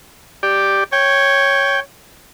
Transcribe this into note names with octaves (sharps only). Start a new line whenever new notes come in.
G4 D5
C#5 G5